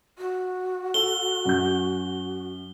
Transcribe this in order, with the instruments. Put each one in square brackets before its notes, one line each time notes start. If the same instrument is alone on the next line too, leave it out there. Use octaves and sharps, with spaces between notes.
[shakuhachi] F#4
[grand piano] A4 [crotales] G7
[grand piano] F#2 G6